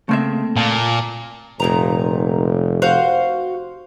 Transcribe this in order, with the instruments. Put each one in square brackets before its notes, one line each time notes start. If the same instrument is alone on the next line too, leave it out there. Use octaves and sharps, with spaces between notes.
[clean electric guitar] C#3 A#3 [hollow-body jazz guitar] A3 C4 E5
[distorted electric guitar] A#2 [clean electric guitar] F5 A5
[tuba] F1 [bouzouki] A#2 D#3 A#5
[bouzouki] F#4 C5 F5